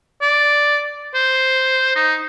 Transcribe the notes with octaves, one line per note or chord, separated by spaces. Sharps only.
D5
C5
D#4